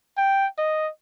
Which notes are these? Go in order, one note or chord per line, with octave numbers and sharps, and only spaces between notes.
G5
D#5